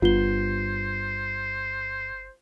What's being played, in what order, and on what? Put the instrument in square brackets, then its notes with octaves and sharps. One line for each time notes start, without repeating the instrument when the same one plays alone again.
[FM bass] G1 [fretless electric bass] G2 B3 [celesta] F4 G7 [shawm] C5